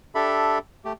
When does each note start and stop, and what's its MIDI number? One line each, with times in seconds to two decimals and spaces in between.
0.15 0.58 62
0.15 0.58 67
0.15 0.58 69
0.15 0.58 76
0.15 0.58 83
0.85 0.93 57
0.85 0.93 67